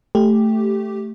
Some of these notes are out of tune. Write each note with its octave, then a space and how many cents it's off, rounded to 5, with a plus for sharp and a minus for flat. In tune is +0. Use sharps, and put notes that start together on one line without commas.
A3 +0 G4 +0